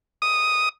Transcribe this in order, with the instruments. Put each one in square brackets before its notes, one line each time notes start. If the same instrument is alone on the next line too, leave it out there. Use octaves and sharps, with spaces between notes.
[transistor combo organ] D#6